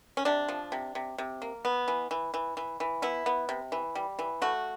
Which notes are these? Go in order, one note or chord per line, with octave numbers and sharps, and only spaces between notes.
C#4
C3 D4
F3
C3
C3
C3
A#3
B3
E3
E3
E3
E3
E3
B3 E4
B3
C3
E3
G3
E3
A3 F#4